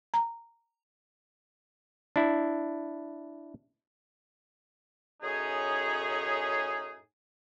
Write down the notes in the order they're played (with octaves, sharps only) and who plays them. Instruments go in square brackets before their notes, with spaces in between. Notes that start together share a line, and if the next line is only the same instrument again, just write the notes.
[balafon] A#5
[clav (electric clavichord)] D4 E4
[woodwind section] F#2 A2 C#4 D#4 G#4